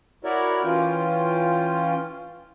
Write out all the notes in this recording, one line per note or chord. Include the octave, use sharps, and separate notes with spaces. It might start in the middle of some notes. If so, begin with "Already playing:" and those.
E4 F#4 A#4 C#5 D5
E3 C#4 F4 G5